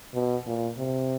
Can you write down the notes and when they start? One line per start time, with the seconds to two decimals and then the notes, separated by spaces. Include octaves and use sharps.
0.14 B2
0.47 A#2
0.78 C3